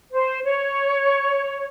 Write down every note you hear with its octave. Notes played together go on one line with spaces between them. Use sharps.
C5
C#5